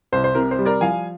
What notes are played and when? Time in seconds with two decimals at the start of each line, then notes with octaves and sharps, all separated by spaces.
0.12 C2 C5
0.24 C5
0.35 C3 A#4
0.51 C5
0.59 G3
0.66 A#4 D5
0.81 F3 F5 G#5